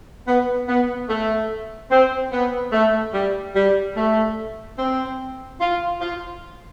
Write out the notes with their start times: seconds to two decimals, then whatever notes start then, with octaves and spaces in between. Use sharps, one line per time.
0.28 B3
0.68 B3
1.09 A3
1.91 C4
2.32 B3
2.72 A3
3.14 G3
3.56 G3
3.96 A3
4.78 C4
5.61 F4
6.01 F4